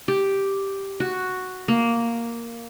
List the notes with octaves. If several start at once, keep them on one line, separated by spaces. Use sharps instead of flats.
G4
F#4
A#3